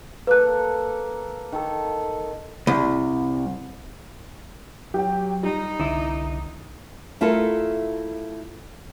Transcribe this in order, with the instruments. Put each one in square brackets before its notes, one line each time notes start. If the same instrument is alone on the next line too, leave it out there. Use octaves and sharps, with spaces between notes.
[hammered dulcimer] A#3 A4 [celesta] B4 F#6
[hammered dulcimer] D#3 A4
[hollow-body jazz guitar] C2
[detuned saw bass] F#3 [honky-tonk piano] G4 G5
[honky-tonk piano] G3 [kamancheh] D#4
[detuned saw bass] C2 [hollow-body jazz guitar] D3 E4 [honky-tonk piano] D#6
[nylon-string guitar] A3 E4 F4 A4 A#4 A5